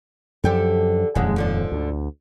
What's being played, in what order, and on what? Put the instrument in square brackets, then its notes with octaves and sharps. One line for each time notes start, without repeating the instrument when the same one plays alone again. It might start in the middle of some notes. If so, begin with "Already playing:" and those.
[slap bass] F#2 F3 [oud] D3 G4 A4
[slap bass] D#1 F2 [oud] G#2 D3 G#3
[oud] G#2 D3 F3
[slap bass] D2